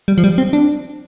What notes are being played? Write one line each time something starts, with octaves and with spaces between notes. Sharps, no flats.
G3
F3
G3
C4
D4